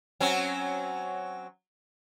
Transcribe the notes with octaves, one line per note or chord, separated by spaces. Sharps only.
F#3 C4 C#4